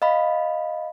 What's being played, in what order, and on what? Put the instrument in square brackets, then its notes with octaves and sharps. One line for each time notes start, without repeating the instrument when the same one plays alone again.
[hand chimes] D#5 F5 B5